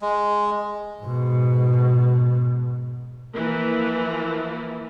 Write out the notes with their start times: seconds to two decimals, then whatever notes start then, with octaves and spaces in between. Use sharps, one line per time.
0.02 G#3
1.02 G#2 B2
3.35 E3 F3 A#3